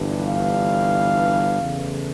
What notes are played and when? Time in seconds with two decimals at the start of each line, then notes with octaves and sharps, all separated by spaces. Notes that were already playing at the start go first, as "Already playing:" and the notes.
Already playing: G1 G2 E3
0.24 F5
1.60 E2 C#3 E3 A3